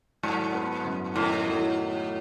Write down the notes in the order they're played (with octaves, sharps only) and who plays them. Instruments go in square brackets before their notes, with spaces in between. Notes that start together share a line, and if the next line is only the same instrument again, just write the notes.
[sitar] G#2 [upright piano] F#3
[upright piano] B3
F#2
[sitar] A2 [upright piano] D#3
[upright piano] F#3